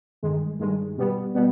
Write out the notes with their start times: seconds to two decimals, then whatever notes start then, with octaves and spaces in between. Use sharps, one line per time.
0.23 G2 D#3 G#3
0.60 G2 D#3 G#3
0.97 B2 G3 B3
1.35 B2 G3 B3